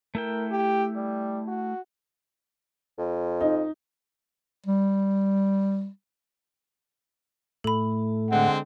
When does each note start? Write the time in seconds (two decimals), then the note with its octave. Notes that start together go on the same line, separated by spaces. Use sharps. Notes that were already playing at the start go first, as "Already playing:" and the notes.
0.15 A3 E4 A#4 G5
0.51 G4
0.95 G3
1.48 F#4
2.98 F2
3.41 D#4
4.66 G3
7.64 A2 A3 A4 B5
8.30 D3 G#3 C4 F#5